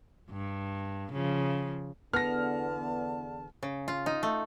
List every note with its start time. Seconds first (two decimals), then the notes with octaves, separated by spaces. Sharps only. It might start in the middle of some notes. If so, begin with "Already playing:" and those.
0.30 G2
1.12 C#3 F3
2.13 E2 D3 B3 A5 F6 A#6
3.63 C#3
3.88 F4
4.06 D#4
4.23 A3